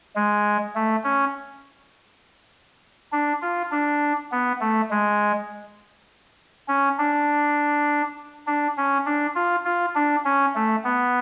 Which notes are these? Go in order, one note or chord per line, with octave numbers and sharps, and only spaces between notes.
G#3
A3
C#4
D4
F4
D4
B3
A3
G#3
C#4
D4
D4
C#4
D4
F4
F4
D4
C#4
A3
B3